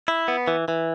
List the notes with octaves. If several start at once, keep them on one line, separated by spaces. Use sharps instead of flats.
E4
B3
E3
E3